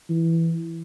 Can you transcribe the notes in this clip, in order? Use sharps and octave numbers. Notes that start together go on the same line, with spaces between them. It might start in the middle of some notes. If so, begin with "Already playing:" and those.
E3